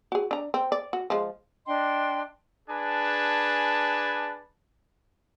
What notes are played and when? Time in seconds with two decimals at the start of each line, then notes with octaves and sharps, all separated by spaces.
0.12 F#4 G#4
0.31 D4 A#5
0.54 C4
0.72 D5
0.93 F#4
1.10 F3 G#3
1.66 D4 D#5 G5 C6
2.69 D4 G#4 B4 G#5 A5